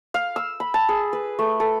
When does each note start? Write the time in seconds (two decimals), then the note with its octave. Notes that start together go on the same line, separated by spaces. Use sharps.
0.14 F5
0.36 E6
0.60 B5
0.74 A5
0.89 G#4
1.13 B4
1.39 A3
1.60 A4